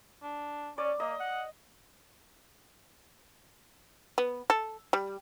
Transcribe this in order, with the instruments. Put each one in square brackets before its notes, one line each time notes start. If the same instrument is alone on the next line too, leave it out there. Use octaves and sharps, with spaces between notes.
[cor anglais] D4
[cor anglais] C#4 [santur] D5
[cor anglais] A#3 [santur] D#5
[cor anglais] F#5
[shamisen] B3
A4
G3